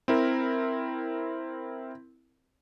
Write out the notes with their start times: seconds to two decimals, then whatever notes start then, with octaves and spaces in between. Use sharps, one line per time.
0.08 C4 E4 A#4